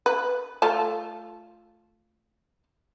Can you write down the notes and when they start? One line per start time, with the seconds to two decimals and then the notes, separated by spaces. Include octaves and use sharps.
0.06 B4
0.62 A3 F4 A5